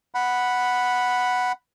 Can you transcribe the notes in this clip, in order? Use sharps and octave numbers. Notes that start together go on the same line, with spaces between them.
F#5 B5